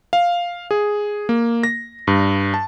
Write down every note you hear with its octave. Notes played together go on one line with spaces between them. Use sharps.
F5
G#4
A#3
A#6
G2
A5